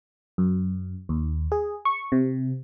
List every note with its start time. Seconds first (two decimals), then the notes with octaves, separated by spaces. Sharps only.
0.38 F#2
1.09 D#2
1.52 G#4
1.85 C#6
2.12 C3